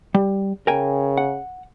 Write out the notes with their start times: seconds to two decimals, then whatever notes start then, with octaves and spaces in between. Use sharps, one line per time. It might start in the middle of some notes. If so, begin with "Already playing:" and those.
0.14 G3
0.67 C#3 A#4 G5 G#5
1.17 F#5